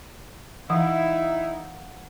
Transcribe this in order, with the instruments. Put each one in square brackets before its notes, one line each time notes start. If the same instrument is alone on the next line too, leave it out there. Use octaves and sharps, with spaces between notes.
[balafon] E3 [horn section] D#4 E4 [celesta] F5 F#5